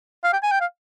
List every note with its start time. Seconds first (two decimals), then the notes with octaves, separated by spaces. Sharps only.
0.24 F5
0.33 G5
0.43 G#5
0.51 G5
0.60 F5